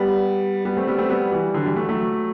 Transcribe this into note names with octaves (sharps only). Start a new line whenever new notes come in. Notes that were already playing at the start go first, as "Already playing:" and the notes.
Already playing: G3 B3
G3 B3
A3 C4
G3 B3
A3 C4
G3 B3
E3 G3
D3 F#3
E3 G3
F#3 A3
F#3 A3